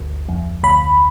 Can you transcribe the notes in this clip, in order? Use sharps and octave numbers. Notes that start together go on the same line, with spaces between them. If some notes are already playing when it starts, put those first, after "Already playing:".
Already playing: G1 D2
F2
D2 B5